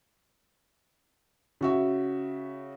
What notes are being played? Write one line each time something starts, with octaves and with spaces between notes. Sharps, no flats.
C#3 F#4 E5